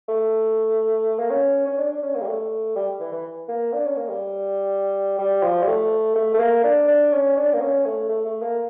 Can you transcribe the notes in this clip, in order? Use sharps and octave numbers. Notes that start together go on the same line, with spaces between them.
A3
A#3
C#4
C#4
D4
D4
C#4
A#3
G3
A3
G3
E3
E3
A#3
D4
C#4
A#3
G3
G3
F3
G3
A3
A3
A3
A#3
D4
D4
C#4
D4
A#3
C#4
A3
A3
A3
A#3